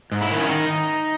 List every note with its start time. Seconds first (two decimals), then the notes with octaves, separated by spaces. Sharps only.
0.12 G#2
0.21 E4
0.31 D#3
0.38 C#4
0.49 D#3 D#4